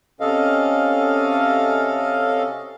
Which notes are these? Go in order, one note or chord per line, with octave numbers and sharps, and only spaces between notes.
C3 C#4 A4 D#5 F5